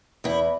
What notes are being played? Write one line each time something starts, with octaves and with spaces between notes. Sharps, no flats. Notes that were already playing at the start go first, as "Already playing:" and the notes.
E2 E4